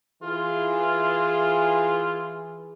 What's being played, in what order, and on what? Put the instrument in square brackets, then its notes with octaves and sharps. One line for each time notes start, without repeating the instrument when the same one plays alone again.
[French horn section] E3 G#4 [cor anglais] F4